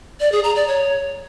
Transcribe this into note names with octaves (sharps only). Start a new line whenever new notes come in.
D5
G#4
A#5
D5
C#5